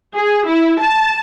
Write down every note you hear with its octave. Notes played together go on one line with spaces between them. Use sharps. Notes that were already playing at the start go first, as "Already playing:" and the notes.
G#4
E4
A5